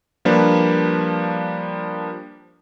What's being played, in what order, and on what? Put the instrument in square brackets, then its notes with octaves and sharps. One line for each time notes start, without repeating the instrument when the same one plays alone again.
[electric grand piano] F3 G3 A#3 D4 G4 B4